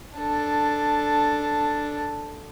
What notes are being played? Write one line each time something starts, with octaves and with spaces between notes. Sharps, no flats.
D4 A4